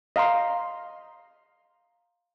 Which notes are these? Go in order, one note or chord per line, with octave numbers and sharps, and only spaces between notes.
D#5 F5 A#5 C6